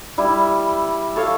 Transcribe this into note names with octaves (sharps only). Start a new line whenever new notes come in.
G3 E4
A4 C#5 F5